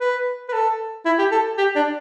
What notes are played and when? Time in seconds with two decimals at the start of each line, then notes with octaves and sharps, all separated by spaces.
0.01 B4
0.49 B4
0.53 A4
1.06 E4
1.19 G4
1.31 A4
1.58 G4
1.76 D4